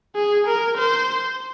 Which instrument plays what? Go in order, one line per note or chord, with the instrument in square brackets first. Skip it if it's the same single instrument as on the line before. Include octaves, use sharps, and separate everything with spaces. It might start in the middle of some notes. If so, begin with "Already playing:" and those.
[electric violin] G#4
A#4
C5